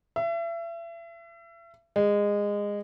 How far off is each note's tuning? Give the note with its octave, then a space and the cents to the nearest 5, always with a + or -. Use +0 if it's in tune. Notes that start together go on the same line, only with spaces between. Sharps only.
E5 +35
G#3 -20